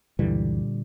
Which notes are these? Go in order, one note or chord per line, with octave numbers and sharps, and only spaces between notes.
C#2 F#2 A#2 D3 E3 G3